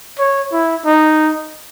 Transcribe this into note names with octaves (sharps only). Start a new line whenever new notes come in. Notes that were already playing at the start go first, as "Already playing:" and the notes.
C#5
E4
D#4